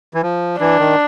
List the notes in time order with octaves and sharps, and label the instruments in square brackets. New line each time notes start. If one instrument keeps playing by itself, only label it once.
[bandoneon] E3
F3
[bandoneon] E3 [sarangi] D4
[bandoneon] D#3